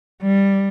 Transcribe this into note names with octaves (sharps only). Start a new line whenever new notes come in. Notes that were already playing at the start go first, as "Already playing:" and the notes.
G3